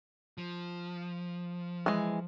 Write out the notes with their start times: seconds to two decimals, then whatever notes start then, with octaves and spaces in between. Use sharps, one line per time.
0.38 F3
1.86 E3 G#3